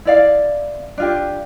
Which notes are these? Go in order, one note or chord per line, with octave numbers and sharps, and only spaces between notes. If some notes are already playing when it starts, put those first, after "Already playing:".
E4 D5 F5
D4 F4 G4